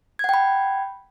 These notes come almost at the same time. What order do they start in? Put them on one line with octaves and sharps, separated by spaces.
G#6 F#5 G5 B5